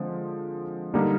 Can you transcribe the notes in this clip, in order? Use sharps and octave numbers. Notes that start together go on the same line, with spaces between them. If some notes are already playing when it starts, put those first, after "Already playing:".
Already playing: D3 F3 G#3 C4
D3 G3 A#3 D#4